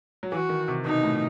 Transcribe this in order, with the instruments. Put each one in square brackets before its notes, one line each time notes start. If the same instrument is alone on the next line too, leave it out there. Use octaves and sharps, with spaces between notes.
[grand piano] F#3
[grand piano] E3 [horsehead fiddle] F#4
[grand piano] D#3
C3
[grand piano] B2 [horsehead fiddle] D#4
[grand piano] A2